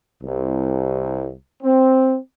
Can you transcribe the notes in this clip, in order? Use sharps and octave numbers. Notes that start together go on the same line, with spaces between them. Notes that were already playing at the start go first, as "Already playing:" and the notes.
C2
C4